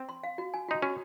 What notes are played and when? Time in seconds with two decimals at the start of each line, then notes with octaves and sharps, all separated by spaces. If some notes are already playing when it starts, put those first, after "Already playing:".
Already playing: C4
0.09 C6
0.24 F5
0.38 F#4
0.54 G#5
0.68 D#4 F#4
0.82 C#4 F#4